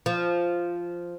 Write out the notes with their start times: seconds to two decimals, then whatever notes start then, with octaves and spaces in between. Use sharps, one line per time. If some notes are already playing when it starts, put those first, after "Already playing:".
0.06 F3